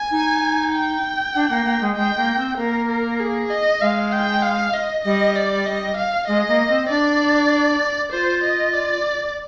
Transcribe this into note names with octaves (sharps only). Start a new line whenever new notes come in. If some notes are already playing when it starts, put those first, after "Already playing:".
Already playing: G#5
D#4
G5
D4
A#3
A#3
G#3
G#3 G5
A#3
C4
A#3 A#4
A#4
G#4
D#5
G#3 F5
G5
F5
D#5
G3 D#5
D5
D#5
F5
G#3 D#5
A#3
C4
D4 D5
F4 C5
D#5
D5